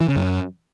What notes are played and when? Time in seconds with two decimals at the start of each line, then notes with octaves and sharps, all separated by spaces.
0.01 E3
0.08 C#3
0.16 F#2